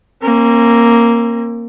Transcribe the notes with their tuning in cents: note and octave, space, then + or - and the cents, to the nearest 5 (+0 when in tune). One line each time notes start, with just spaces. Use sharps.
A#3 +0 C#4 -45